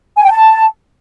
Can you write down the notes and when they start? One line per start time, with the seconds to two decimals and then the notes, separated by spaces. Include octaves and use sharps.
0.17 G#5
0.24 G5
0.30 A5